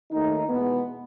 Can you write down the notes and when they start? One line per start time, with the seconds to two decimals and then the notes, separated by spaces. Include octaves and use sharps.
0.11 D#2 D#3 A3 D#4
0.49 E2 B2 G#3 B3